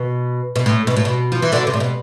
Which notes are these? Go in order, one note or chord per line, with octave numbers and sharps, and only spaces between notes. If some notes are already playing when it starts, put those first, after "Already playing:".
Already playing: B2
B2
A2
B2
A2
B2
F3
E3
B2 D3
C3
A2
B2